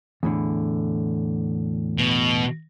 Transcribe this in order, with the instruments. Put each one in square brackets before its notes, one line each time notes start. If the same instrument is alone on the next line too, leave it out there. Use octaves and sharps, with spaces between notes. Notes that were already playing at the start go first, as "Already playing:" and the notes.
[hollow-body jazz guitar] E2 A2 D3
[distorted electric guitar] B2